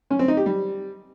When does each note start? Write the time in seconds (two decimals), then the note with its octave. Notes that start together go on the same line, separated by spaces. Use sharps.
0.10 C#4
0.19 C4
0.28 D#4
0.37 G4
0.46 G3